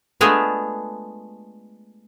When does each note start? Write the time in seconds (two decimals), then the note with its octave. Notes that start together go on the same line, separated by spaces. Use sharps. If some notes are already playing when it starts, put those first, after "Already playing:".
0.21 G#3 A3 B3 D4 F4 G#4